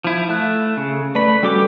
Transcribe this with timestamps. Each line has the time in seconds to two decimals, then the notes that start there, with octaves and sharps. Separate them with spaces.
0.04 F3 E4
0.29 A3 F5 A5 F#6
0.77 C#3
1.15 A3 B4 D5 B5
1.43 G3 C#4 F#4 G4 A4 D6